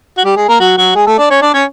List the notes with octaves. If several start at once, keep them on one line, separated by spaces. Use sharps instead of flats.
F#4
G3 G4
G#3 G#4
A#3 A#4
F#3 F#4
F#3 F#4
G#3 G#4
A3 A4
D4 D5
C#4 C#5
D4 D5
C#4 C#5